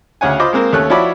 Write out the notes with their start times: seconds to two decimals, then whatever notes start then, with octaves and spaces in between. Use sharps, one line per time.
0.21 D2 C#3 C#5 F#5 G#5
0.40 F4 C5 D#5 B5 D6
0.53 G#3 A#3 C4 A#4
0.73 D#2 A3 C#4 F#6
0.90 F3 E4 F#4 C#5 D5 B5